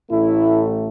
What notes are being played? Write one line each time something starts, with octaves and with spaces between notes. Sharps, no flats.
A1 A2 A3 E4